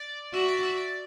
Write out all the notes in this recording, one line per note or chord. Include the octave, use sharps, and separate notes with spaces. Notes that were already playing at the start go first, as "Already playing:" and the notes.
Already playing: D5
F#4 E5
D5
E5
D5